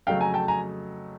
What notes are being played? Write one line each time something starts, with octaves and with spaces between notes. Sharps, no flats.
F2 C#3 F#3 A3 F5 G5
G#5 A#5
G5 A5
G#5 A#5